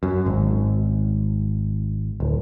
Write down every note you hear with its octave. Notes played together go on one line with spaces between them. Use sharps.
F#2
G#1
D1